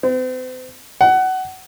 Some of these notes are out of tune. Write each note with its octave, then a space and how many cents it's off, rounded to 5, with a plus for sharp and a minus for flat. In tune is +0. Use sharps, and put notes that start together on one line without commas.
C4 -40
F#5 +20